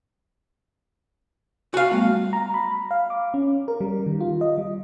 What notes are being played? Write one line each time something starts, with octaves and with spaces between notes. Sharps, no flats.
F#4 F5 G#5
G3 A3 B3
A#5
B5
F5
D6
C#4
A#4
G3
D#3
F4
D#5
G3